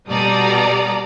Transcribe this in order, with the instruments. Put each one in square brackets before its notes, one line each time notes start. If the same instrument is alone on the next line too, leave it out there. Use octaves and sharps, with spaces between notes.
[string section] B2 G3 A4 D5 A#5 D#6